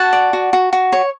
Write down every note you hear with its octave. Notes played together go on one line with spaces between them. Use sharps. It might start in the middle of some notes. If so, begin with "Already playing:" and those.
Already playing: F#4 F#5 A5
D5
F#4
F#4
F#4
C#5